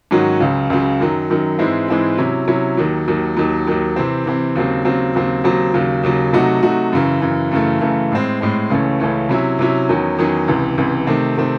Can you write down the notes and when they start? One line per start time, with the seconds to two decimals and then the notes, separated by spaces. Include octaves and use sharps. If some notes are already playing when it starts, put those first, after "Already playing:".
0.11 G#2 D#3 F#3 C#4 F#4
0.40 C#2 C#3 F#3
0.70 C#2 C#3 F#3
1.00 F#2 D#3 F#3
1.30 F#2 D#3 F#3
1.59 G#2 E3 G#3 C4 E4
1.88 G#2 E3 G#3 C4 E4
2.18 C3 F#3 C#4 E4
2.48 C3 F#3 C#4 E4
2.77 D#2 D#3 F#3
3.08 D#2 D#3 F#3
3.37 D#2 D#3 F#3
3.67 D#2 D#3 F#3
3.96 C3 E3 C4
4.26 C3 E3 C4
4.55 D#2 C#3 F#3 C4
4.85 D#2 C#3 F#3 C4
5.15 D#2 C#3 F#3 C4
5.44 D#2 C#3 F#3 C4
5.74 D#2 C#3 F#3
6.03 D#2 C#3 F#3
6.33 C3 F#3 A3 D#4 F#4
6.62 C3 F#3 A3 D#4 F#4
6.93 F#2 C#3 E3
7.22 F#2 C#3 E3
7.51 F#2 C#3 E3 A3
7.81 F#2 C#3 E3 A3
8.12 A2 G#3 C4
8.41 A2 G#3 C4
8.70 C#2 C#3 E3 A3 C#4
9.00 C#2 C#3 E3 A3 C#4
9.29 C3 F#3 C#4 E4
9.59 C3 F#3 C#4 E4
9.89 E2 D#3 F#3 C#4
10.18 E2 D#3 F#3 C#4
10.48 C#2 C3 E3
10.78 C#2 C3 E3
11.07 C3 D#3 A3 C4
11.37 C3 D#3 A3 C4